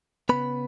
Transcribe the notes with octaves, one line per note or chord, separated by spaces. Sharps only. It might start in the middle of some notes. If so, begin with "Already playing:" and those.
C#3 B3 B4 B5